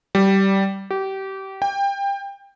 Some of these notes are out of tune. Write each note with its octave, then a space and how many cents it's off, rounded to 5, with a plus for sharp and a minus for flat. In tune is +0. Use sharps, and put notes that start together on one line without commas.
G3 -15
G4 -25
G5 +25